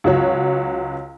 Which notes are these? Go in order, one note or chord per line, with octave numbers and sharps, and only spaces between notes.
C#2 F#3 F#4 C#5